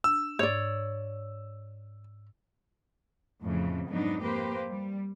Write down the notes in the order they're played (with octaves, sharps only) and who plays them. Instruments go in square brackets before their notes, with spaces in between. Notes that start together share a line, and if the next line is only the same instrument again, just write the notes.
[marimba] D4 [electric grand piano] E6
[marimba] G#2 [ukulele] C#5 D5
[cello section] F2 A2 C#3 E3
F2 G#2 F#3 B3 D4 D#4
A#3 G4 B4 C5
G3